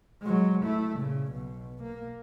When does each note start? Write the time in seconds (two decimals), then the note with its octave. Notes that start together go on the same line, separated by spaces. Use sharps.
0.22 F#3 G#3
0.63 A3 E4
0.97 A#2 C#3
1.30 B1 B2
1.83 A#3